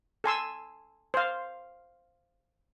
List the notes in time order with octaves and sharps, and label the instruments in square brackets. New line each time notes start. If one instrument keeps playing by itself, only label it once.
[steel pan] A4 G#5 C6 E6
C5 F5